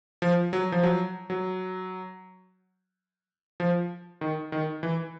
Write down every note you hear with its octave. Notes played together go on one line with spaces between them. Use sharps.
F3
F#3
F3
F#3
F#3
F3
D#3
D#3
E3